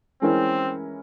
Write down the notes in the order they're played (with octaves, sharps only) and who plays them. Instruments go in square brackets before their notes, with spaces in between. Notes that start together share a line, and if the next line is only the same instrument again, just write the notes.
[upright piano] E3 G#3 C#4 E4 A#4 [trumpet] C4